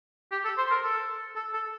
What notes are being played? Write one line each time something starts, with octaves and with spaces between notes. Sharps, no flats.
G4
A4
C5
A#4
A4
A4
A4